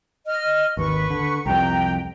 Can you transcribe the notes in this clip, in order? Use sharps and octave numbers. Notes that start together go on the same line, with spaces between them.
D#5 F6
G#1 D#2 B4 C#6
D3
C2 F2 G4 G5 A#5